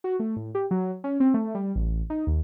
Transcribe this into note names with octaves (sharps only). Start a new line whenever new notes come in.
F#4
A3
A2
G4
F#3
C#4
C4
A3
G3
A1
D#4
D#2